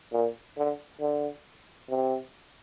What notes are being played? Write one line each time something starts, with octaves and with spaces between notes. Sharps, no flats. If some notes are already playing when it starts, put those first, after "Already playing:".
A#2
D3
D3
C3